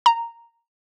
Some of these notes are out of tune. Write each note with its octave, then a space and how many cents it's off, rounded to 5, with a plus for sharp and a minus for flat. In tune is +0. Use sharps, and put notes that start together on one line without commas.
A#5 -5